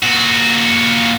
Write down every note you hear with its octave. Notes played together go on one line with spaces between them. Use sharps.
A#2 F#4